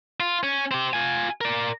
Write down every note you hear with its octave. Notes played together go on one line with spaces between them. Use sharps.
F4
C#4
C4 G4
F4 G#5
A#4 D5